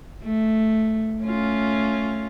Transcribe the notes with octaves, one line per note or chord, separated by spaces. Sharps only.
A3
A3 C#4 F4